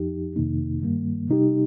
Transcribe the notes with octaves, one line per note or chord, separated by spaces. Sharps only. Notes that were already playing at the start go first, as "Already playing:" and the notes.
Already playing: F2 F3 D#4 G4
F2 C3 D#3 A#3 D#4
G2 D#3 G3 A#3
C3 G3 D#4 G4